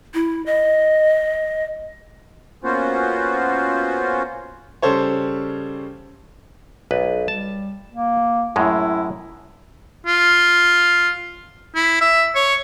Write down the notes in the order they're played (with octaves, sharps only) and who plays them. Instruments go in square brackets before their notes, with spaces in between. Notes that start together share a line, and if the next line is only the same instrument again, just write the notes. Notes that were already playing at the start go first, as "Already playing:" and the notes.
[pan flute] E4
D#5
[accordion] A#3 B3 C#4 F4 F#4 C5
[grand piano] C#3 G3 A4 C5 C#5
[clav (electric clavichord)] B1 B4
[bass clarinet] G3 [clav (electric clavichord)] A5
[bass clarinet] A#3
[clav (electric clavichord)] F#2 A2 G#3 [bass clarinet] E4
[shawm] F4
E4
E5
C#5